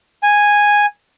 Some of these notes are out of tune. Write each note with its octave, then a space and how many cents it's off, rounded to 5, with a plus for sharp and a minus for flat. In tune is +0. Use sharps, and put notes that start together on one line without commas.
G#5 -5